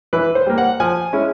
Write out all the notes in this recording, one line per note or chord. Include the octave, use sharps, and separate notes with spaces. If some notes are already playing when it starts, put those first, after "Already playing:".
E3 B4
C5
G3 A#3
F#5
F3 G#5
G#3 C#4 E4